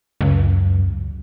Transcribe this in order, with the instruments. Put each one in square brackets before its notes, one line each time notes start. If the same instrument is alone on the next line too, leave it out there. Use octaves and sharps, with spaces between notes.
[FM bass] C#2 [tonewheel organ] F#2